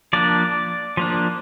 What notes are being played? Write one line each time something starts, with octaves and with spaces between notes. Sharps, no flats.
F3 A#3 D4 D5
F3 A#3 D4